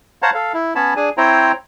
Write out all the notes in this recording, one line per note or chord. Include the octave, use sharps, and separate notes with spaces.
C5 C#5 F5 F#5 A5 A#5
A4 F5
E4
B3 C#4 C#5 A5 B5
D4 G#4 G#5
C4 E4 C5 C#5 G5 A#5